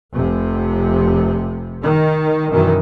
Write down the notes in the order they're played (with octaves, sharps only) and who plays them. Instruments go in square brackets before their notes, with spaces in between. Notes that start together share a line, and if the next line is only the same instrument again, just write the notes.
[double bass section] F1 C3
D#3
F#2 B2 D#3 E3